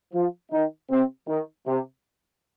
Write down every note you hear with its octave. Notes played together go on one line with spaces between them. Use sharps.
F3 F4
D#3 D#4
C3 C4
D#3
C3